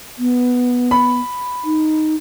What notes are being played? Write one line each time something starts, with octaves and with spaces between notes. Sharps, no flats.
B3
B5
D#4